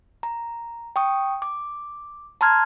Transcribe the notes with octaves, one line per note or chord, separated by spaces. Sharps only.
A#5
G5 C#6 D#6
D6
A5 A#5 C6 F6 G#6